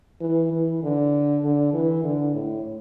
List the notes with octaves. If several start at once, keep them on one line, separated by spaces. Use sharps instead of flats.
E3
E3
D3
D3
E3
D3
A2